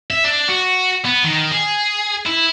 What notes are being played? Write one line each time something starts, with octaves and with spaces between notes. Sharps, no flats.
E5
D4
F#4
B3
D#3
G#4
E4